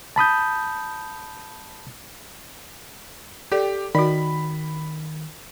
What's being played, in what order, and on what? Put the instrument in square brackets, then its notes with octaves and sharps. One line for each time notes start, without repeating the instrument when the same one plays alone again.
[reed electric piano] A5 B5 D#6 G6
[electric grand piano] G4 [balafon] A4 D5 G5
[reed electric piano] D#3 [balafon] F#4 D5 [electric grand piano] B5